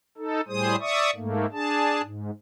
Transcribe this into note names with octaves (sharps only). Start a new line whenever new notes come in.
D#4 A4
A2 G3 G#4 C5 D#6
D5 E5 C#6 D#6
G#2 A3 A#3
D4 G#4 A5
G#2